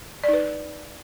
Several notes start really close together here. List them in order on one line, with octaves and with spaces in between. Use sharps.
D5 D#4 B4